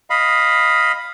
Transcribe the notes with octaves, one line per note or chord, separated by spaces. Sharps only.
D#5 F5 B5